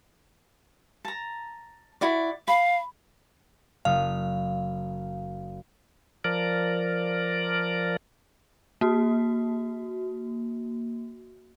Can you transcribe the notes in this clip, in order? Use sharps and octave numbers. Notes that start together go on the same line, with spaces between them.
A5 A#5
E4 F#4 D5
F5 B5
F#1 F5 D#6
F3 A#4 D5
A#3 F#4